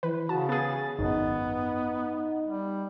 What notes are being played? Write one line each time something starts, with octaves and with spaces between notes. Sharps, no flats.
E3 B4
C#3 F#4 A5
B3 G#4 A6
G#1 F#2 B3 D#4
G3